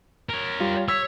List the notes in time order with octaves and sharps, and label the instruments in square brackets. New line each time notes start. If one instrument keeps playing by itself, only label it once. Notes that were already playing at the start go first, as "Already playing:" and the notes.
[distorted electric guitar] A#4 C#5
[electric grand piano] G3 F4
[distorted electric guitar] C#5 [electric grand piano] E6 B6